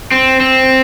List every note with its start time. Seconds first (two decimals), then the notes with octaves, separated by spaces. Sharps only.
0.12 C4
0.40 C4